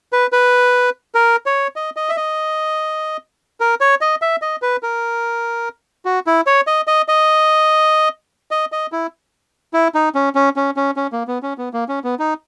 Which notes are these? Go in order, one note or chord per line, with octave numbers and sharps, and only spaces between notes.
B4
B4
A#4
C#5
D#5
D#5
E5
D#5
A#4
C#5
D#5
E5
D#5
B4
A#4
F#4
E4
C#5
D#5
D#5
D#5
D#5
D#5
E4
E4
D#4
C#4
C#4
C#4
C#4
C#4
A#3
B3
C#4
B3
A#3
C#4
B3
D#4